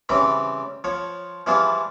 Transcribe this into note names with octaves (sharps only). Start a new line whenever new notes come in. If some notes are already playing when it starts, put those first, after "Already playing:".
C#3 E3 G3 C4
F3 C#5
E3 F3 G3 F4 G#4